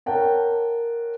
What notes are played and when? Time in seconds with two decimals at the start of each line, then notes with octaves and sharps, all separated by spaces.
0.06 A#4 C#5 F#5 G5 A5